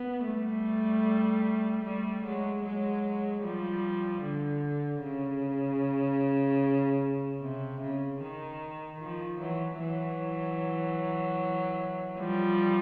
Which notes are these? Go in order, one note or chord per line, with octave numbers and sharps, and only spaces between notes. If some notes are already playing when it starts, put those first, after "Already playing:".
Already playing: B3
G3 A3
G3 A3
F#3 G#3
F#3 G#3
F3 G3
D3
C#3
C3
C#3
D#3
D#3 F3
E3 F#3
E3 F#3
F3 G3